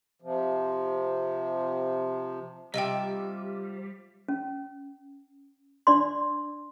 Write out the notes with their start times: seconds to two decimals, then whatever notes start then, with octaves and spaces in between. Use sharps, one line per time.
0.22 C3 F3
2.74 C3 F3 G3 D#5 E5 G5
4.28 C#4
5.87 D4 D5 C6